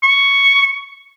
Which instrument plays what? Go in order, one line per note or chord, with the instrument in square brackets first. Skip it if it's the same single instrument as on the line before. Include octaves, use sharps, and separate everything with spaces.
[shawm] C#6